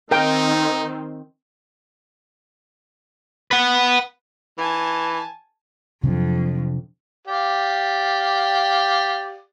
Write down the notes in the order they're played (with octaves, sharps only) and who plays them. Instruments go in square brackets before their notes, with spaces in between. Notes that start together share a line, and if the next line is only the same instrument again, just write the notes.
[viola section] D#3 C4 [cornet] D#4 [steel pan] A#4 G5
[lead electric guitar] B4 F#5
[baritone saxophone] E3 [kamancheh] G#5 A5
[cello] F2 [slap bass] C3 F#3 D4
[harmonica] G4 D5 F5